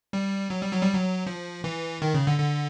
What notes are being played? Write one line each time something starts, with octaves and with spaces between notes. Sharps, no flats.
G3
F#3
G3
F#3
G3
F#3
F3
E3
D#3
C#3
D3
D3